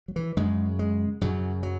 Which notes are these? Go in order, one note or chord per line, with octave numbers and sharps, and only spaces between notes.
F#3
E3
F#2 C#3 G#3
G#3
F#2 C#3 F#3
F#3